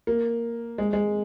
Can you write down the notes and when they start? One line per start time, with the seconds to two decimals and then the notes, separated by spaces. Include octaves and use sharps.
0.07 A#3
0.78 G#3
0.93 G#3